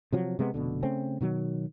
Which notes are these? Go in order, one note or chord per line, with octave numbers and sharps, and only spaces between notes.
C3 F3 F#3
C3 G#3 A3 B3
F1 B2 D3
C#3 A3 C4 C#4
B2 D#3 F#3